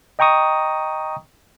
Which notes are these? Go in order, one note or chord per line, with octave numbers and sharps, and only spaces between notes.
D#5 G5 A#5 C#6 D#6